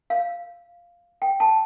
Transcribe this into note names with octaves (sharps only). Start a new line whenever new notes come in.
F5
G5
A5